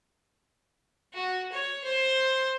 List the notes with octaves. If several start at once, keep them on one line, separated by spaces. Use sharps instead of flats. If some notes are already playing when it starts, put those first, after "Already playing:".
F#4
C#5
C5